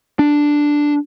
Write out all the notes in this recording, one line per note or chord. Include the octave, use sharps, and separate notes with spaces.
D4